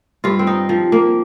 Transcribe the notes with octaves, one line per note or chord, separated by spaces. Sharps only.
G2 F4
C4
D#4
F3
A#3